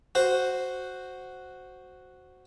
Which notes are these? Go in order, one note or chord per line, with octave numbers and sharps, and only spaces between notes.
F#4 C5